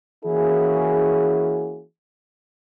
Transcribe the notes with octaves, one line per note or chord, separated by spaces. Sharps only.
E3 A#3 C#4 E4 F#4 G#4